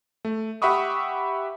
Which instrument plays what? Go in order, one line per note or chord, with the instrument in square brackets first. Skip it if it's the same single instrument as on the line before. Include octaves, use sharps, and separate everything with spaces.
[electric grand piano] A3
G4 E5 F#5 B5 C#6 D#6